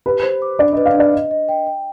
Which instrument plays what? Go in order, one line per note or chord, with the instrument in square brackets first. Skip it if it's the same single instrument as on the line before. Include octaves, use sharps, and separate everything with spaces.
[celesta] G4 [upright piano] B4
[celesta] C5
D6
[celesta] D4 [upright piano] D5
[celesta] B4 [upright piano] D#5
[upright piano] F5
[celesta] D4 [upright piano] D5
[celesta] D#5
D#5
G5
G5